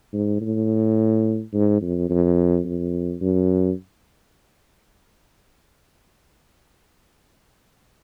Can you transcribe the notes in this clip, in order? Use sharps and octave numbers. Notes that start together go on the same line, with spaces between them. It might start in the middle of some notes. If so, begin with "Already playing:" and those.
G#2
A2
G#2
F2
F2
F2
F#2